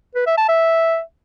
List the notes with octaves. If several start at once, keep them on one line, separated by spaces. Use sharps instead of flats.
B4
E5
A5
E5